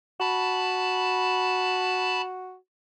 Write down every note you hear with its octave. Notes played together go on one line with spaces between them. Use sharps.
F#4 A5 B5